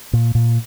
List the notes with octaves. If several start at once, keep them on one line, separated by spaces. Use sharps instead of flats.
A#2
A#2